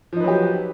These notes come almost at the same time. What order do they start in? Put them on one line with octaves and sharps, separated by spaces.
F3 D#4 B4 F#3 G4